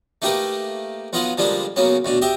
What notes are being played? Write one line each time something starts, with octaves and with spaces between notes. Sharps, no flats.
A3 A#3 D#4 G4 A#4 B4
B1 B3 F4 D#5 F5 F#5
D3 F3 G3 G#3 A#3 D4
C#3 F#3 A#3 B3 C#4
D2 B2 D4
G4 D#5 E5 G5